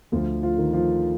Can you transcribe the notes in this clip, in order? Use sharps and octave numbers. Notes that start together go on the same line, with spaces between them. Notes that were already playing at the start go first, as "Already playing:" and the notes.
D2 F3 F4
F3 F4
D#3
F3 F4